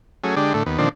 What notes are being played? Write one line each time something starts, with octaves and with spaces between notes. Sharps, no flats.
F#3 A3 C#4 G#4
D3 G#3 D4 G4
A2 D3 A3
D#2 B3
A#2 D3 D#3 F3 C4 D4